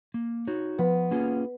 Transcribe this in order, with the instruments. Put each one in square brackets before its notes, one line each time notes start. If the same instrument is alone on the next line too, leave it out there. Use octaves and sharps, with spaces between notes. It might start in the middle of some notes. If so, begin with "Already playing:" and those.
[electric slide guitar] A#3
D#4 F#4 C#5
[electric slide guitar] F3 [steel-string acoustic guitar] B3
[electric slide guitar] A#3 C#4 F4 G#4